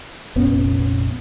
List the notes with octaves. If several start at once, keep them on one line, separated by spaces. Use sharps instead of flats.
F1 A#1 B3 C#4